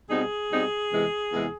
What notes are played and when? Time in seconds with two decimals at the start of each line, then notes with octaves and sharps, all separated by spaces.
0.08 B2 G3 C4 D#4 G#4
0.50 B2 G3 C4 D#4
0.91 E2 C3 E3 G#3
1.32 E2 C3 E3 G#3